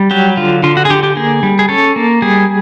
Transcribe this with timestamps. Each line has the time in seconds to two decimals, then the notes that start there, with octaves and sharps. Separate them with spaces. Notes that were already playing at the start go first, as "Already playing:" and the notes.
Already playing: G3
0.11 F#3 G4
0.37 D3 F4
0.63 D3 F4
0.77 F#4
0.85 G#4
0.90 D3 G4
1.03 G4
1.17 A#3 G#4
1.43 G3
1.59 G#4
1.69 C#4 A4
1.96 A#3
2.22 G3 G#4